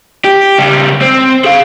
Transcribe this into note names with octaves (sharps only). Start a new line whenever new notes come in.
G4
C#3 G3
C4
G#4 F5